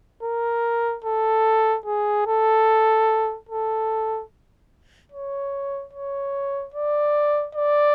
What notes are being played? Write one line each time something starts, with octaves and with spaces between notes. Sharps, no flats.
A#4
A4
G#4
A4
A4
C#5
C#5
D5
D5